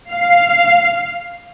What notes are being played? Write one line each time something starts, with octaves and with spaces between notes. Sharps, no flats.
F5